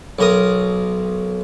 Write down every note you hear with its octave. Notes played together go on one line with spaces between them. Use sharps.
B1 A#4 D#6